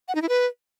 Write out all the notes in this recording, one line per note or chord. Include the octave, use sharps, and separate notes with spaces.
F#5
D#4
E4
B4